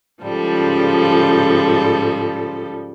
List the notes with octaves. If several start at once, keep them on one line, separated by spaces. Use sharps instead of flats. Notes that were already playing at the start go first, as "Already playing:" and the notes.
G#2 C#3 F3 G3 A4